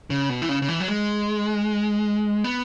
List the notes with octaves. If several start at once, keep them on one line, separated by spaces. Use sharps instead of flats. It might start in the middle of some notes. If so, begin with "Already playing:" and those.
C#3
B2
E3
C#3
C#3
E3
F#3
G#3
B3